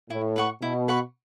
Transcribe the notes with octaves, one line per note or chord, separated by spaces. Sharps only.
A2 E4
B4 F#5 C#6
B2 E4
B4 F#5 C#6